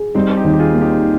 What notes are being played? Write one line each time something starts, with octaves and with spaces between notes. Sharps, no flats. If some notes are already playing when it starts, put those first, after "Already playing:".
Already playing: G#4
G3 C4 D#4
D#4 G4
D#2
G4
F4 G#4
A#3
D#4 G4